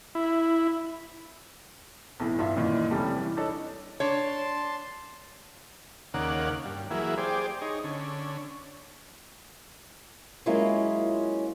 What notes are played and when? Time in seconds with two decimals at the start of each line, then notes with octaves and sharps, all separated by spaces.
0.15 E4
2.20 B1 A2 E3
2.39 G2 F4 E5
2.56 F#2 A#2 D#3 E3
2.90 F1 E3 G3 A3 C#4
3.17 E3
3.37 D4 D#4 A4 C#5
4.00 D4 C#5 A5 C6
6.14 D#2 C#3 A#3 D5 F#5
6.65 G2
6.91 E3 F#3 A#3 E4 G#4
7.18 G4 G#4 C5 D5
7.62 D#4 G#4 C#5
7.84 D3 C#4
10.46 F#3 G#3 A#3 C#4 E4 F4